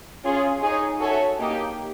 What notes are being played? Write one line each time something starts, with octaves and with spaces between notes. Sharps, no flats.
C#4 F4 G#4 C#5
D#4 G#4 C#5
F#4 A4 C#5 E5 G#5
A#3 D#4 G4